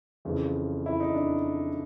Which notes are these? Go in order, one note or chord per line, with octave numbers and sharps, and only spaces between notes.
F2 C#3 E3
E4
D#4
D4